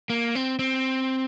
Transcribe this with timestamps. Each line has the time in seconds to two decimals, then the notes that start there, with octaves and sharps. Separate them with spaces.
0.10 A#3
0.35 C4
0.59 C4